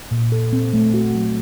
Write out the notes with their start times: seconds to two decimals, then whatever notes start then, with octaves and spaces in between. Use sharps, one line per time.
0.11 A#2
0.32 A4
0.53 C4
0.73 A3
0.94 F#4
1.15 F#3